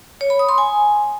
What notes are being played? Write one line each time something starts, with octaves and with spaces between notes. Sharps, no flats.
C#5
B5
D#6
C6
G#5